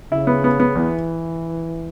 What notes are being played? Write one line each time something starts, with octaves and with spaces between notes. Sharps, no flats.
C#3 E4
B3
B3
B3
E2 E3